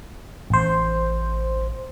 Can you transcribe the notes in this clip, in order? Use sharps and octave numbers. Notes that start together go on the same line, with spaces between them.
A1 C5